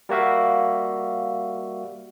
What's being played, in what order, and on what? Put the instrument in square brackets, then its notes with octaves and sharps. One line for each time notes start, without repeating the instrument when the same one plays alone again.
[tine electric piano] G3 A#3 F#4 E5 F5